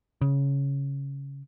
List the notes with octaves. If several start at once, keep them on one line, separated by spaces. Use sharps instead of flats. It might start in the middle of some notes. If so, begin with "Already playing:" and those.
C#3